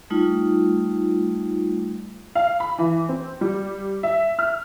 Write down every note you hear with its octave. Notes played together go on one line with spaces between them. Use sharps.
G3 A3 D#4 F4
F5
B5
E3
C4
G3
E5
F6